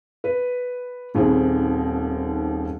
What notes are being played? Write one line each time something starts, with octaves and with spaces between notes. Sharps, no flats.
B4
D#1 D#2 C4 G#4